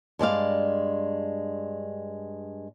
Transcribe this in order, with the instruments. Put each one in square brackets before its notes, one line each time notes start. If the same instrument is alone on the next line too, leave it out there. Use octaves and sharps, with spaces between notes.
[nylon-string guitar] G2 G#3 D5 F5